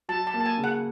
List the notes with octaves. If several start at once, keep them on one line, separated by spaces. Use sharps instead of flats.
F#3 A5
A5
A#3
A5
G#5
C#3
F#5